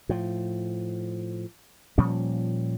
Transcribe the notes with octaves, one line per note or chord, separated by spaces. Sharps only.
A2 F3
A#2 F3 G3 C#4